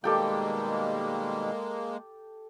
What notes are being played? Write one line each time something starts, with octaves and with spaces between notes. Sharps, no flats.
B2 D#3 G3 G#3 A#3 G4 A4 G5